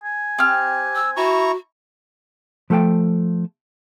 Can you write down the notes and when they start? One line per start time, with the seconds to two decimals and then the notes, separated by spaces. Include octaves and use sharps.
0.04 G#5
0.38 C4 G4 F6
0.95 E6
1.17 E4 F#4 A#5 C#6
2.70 F3 A3 A4 F5 G5 A5